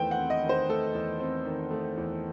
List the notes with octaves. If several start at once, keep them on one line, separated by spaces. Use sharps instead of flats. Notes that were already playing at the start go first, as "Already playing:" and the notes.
Already playing: E2 D#3 A3 B4 C5 G5
F#5
C4
D#5
D#3
C5
A3 A4
E2
C4
D#3
A3
E2